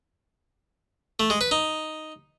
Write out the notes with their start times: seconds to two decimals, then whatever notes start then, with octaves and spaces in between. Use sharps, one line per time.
1.20 A3
1.30 G#3
1.41 B4
1.51 D#4